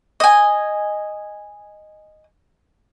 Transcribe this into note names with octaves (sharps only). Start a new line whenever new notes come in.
D#5 G#5